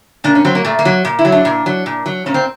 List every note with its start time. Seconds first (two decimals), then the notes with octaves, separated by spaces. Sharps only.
0.24 A#2 D4
0.35 C#4
0.45 F#3 C4
0.55 A#3
0.65 A#2 A3
0.79 A#3
0.85 F#3
1.05 A#2
1.19 E4
1.25 F#3
1.32 D4
1.45 A#2
1.66 F#3
1.86 A#2
2.06 F#3
2.26 A#2 C#4
2.34 C4